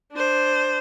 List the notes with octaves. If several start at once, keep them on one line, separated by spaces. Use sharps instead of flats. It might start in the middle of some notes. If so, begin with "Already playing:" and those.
D4 C5